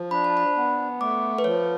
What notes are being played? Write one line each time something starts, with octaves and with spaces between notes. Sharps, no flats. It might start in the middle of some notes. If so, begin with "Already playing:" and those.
Already playing: F3
D4 B5
A5
B5
B3
A3 D6
B4
F3 C#5